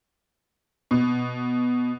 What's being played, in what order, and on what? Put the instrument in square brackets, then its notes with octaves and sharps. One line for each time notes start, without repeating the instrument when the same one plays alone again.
[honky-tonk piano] B2